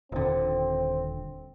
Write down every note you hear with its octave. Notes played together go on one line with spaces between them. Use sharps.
D#1 D3 C4